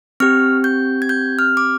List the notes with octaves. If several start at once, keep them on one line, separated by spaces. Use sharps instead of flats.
C4 G4 F6
G6
G#6
G6
F6
D6